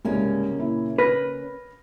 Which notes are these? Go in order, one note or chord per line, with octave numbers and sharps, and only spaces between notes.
C2 G#2 C#3 A#3 C#4
A#2 E4
B4 F6 A#6